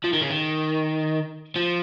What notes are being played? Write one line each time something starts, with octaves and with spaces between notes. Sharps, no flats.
F3
D#3
C#3
D#3
F3